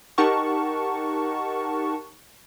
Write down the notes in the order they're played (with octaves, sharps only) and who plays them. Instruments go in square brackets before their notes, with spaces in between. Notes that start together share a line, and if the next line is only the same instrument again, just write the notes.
[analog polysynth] D#4 G4 A#4 F#5 A5 C#6